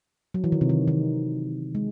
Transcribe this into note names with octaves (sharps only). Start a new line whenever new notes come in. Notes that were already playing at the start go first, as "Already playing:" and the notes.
F#3
E3
D#3
C3
D#3
D#3
G#3